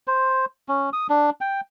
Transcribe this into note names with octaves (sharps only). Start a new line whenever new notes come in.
C5
C#4
D#6
D4
G5